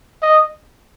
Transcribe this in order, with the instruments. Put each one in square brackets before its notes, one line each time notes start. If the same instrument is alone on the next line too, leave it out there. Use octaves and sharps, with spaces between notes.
[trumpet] D#5